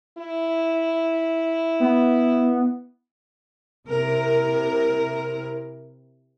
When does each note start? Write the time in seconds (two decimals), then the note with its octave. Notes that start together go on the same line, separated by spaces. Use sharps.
0.18 E4
1.80 B3
3.86 C3 E4 A#4